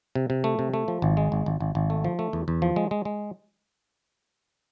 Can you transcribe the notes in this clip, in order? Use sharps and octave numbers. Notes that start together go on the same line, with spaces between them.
C3
C3
A3
C3
A3
F3
G#1
G#3
G#1
G#1
G#1
G#1
A3
F3
A3
E2
E2
F3
G#3
G#3
G#3